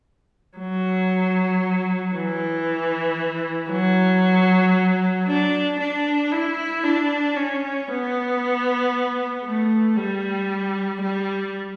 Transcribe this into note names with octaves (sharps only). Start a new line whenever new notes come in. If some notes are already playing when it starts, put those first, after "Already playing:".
F#3
E3
F#3
D4
D4
E4
D4
C#4
B3
A3
G3
G3